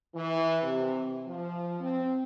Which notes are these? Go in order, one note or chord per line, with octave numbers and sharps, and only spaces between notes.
E3
C3
F3
C4